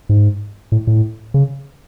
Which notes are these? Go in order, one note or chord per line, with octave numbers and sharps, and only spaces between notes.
G#2
A2
A2
C#3